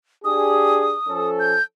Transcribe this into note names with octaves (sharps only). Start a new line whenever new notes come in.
D4 G4 G#4 D#6
F3 C#4 A4
G6